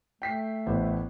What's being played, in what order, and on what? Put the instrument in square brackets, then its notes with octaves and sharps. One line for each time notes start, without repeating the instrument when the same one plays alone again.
[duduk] A3 [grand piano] G5 B6 C7
[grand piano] A1 B3 C5